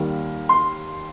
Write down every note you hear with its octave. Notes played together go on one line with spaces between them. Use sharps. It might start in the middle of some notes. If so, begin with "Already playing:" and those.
Already playing: D#2 D#3 G3 A#3
C6